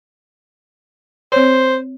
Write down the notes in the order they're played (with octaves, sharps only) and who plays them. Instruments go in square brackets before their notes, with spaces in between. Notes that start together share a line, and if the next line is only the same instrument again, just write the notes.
[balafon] C4 C#5 [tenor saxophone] C5